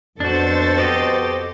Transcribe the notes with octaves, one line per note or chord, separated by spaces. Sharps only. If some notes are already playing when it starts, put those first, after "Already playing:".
F2 B2 D4 F#4 A4 C5 A6
F#4 G4 D#5